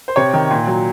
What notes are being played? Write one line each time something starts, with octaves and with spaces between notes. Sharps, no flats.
C5
C3 C#5
D#3
A#2
F#3